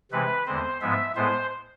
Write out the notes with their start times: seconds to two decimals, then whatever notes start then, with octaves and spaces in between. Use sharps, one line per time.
0.11 C3 E3 G#3 C4 B4
0.46 E2 D3 G#3 C4 C5
0.81 G#2 F3 G#3 B3 E5
1.16 A2 G#3 B3 C5